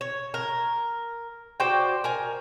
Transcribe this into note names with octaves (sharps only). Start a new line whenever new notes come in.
C#5
A#4
F#4 C5 D5 G5
A#4 G#5